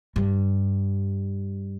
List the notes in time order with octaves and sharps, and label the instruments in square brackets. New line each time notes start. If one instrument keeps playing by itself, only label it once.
[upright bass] G2